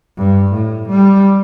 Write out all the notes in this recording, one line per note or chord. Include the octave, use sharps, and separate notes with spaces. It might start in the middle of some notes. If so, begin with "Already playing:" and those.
G2
A2
G3